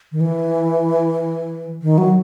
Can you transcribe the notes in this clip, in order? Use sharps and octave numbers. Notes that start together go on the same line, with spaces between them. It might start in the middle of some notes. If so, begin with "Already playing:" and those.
D#3
E3
D#3
F#3